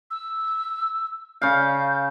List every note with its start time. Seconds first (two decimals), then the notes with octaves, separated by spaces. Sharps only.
0.11 E6
1.42 C#3 F5 G6